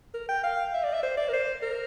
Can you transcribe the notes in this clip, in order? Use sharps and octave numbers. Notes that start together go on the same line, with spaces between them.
A#4
G5
F5
E5
D5
E5
C5
D5
A#4
C5
A#4